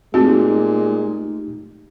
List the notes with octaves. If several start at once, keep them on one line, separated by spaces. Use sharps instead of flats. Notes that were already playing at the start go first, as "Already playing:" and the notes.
A#2 G#3 A3 C4 D#4 F#4 G4